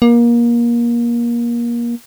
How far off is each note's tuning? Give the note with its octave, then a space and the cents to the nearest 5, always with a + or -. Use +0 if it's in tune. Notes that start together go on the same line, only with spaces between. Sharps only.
A#3 +25